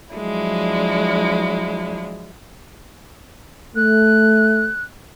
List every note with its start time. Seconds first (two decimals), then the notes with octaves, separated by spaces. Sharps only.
0.14 F3 F#3 G#3 D4 E4
3.75 A3 F#6